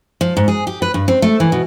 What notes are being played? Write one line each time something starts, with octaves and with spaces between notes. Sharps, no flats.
F3
G#2
G#4
G4
B4
G2
C4
A3
E3
B2